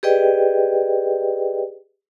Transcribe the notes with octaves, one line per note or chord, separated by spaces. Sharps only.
G4 G#4 B4 D5 D#5 G5